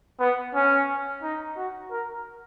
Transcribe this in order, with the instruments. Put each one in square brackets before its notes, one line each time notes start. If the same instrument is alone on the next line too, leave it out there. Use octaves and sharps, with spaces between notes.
[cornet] B3
C#4
D#4
F#4
A#4